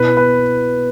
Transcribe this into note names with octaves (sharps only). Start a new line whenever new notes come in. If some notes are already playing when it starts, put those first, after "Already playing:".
Already playing: B2 B3 E4 B4
B4